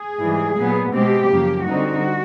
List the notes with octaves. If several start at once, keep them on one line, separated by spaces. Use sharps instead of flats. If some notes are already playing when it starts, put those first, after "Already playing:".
Already playing: G#4
G#2 E3 G3
A#2 F#3 B3
B2 G#3 C4 G4
F#2 C#3 F3 A#3
D3 G3 C4 D#4 F#4